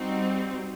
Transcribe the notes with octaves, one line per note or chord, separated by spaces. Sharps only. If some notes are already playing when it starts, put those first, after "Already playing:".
Already playing: G3 C4 D#4 F#4